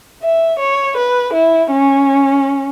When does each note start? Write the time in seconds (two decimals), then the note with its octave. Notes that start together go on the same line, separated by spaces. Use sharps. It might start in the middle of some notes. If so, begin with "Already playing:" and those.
0.23 E5
0.59 C#5
0.97 B4
1.33 E4
1.71 C#4